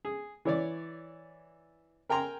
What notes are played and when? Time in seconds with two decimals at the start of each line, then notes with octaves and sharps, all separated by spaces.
0.05 G#4
0.45 E3 C#5 D5
2.09 A#4 G5 G#5 A#5 C6